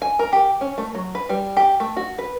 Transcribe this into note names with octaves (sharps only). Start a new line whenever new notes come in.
G#5
A#4
G4
C#4
A3
F#3
B4
G3
G4
A3
F#4
B4